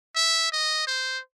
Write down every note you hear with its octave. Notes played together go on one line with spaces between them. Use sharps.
E5
D#5
C5